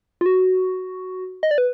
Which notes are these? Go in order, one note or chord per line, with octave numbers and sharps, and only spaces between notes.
F4
F#4
D#5
D5
B4